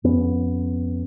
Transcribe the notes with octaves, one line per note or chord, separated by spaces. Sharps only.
F2 B3 C#4